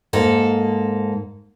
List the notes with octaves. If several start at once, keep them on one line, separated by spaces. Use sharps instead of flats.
G#2 A#3 A4